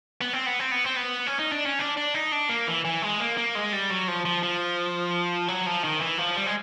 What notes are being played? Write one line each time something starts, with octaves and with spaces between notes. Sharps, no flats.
B3
C4
B3
C4
B3
C4
B3
C#4
D#4
D4
C#4
D4
D4
D#4
D4
A#3
E3
E3
G#3
A#3
A#3
G#3
G3
F#3
F3
F3
F3
F#3
F3
D#3
E3
F3
G3
G#3